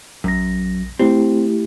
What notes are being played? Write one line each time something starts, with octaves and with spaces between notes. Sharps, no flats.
A#1 F#2 A#6
A3 C4 E4 G4